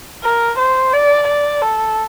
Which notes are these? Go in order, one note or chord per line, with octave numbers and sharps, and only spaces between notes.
A#4
C5
D5
D5
A4